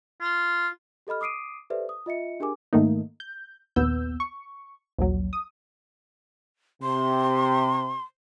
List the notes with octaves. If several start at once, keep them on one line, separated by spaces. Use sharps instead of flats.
F4
G4 A4 D#5 B5 F6
D6 D#6 C7 D7 D#7
G4 A4 B4 C5 D5 E5
D#6
F4 D#5 E5 C#7
D4 G4 G#4 A#4 G#5 D6
G#2 D#3 A3 A#3 D#4
G6
A#1 D#2 B3 E6 G6
C#6
A#1 D#2 F#3
D#6
C3 C6